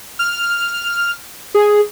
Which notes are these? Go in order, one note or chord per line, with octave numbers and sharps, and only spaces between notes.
F6
G#4